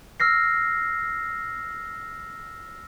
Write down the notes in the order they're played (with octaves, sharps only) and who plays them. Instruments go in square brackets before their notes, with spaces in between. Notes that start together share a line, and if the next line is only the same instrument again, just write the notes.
[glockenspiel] E6 F6 A#6 C7